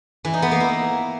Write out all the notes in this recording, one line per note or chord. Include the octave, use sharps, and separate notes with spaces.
E3
D#4
B3
A#3
E4